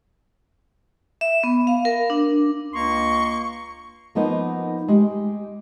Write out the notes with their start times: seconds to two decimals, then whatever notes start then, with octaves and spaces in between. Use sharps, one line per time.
1.21 E5
1.43 B3
1.67 F5
1.85 A#4
2.10 D4
2.74 C#2 A#3 A#5 C6 C#6
4.15 F3 A#3 B3 D#4 C5 F#5
4.88 G#3 G4